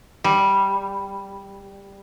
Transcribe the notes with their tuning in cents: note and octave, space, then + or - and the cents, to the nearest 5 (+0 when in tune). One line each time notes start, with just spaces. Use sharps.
G3 +0